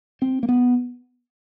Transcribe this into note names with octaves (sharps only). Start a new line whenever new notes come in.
C4
A#3
B3